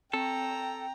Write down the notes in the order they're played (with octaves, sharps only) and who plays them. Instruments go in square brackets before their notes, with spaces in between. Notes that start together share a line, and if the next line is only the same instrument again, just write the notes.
[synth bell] C4 [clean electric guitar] A4 [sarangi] G5 [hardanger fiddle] A#5